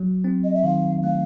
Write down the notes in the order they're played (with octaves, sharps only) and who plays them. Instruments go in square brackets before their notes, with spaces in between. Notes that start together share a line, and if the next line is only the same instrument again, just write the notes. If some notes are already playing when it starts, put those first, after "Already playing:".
Already playing: [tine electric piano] F#3
C4
[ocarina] D#5
E5
[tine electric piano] D#3 [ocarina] F5
[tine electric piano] A3 [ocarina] F5